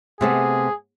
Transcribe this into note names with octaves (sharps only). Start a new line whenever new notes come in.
C3 A3 B3 G#4